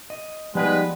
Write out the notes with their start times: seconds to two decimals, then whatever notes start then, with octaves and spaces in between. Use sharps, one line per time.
0.10 D#5
0.55 F3 G3 G#3 B3 D#4 B4 G#5